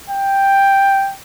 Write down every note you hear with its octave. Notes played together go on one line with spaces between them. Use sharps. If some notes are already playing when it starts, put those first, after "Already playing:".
G5